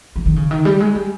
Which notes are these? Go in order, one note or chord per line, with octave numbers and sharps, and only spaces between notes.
F3
D#3
C#3
D#3
G3
G#3
G3